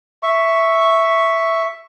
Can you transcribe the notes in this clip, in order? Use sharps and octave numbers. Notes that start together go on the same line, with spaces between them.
E5 C#6